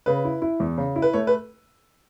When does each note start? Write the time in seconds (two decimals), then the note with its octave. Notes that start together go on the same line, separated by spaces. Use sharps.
0.06 C#3 B4
0.25 E4
0.42 E4
0.60 E2
0.78 C#3
0.96 E4
1.02 B4
1.13 A3 C#5
1.27 B4